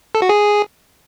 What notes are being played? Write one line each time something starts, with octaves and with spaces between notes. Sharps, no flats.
A4
F#4
G#4